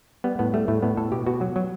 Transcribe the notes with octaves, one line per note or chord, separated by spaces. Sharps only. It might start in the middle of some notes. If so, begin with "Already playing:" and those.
G3 B3
A2 B3
G3 A3
A2 A3
A2 B3
A2 A4
B2 G4
B2 F#4
F#3
F#3